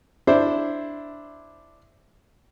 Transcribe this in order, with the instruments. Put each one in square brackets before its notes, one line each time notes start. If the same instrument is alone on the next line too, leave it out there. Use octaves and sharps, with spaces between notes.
[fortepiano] D4 E4 C5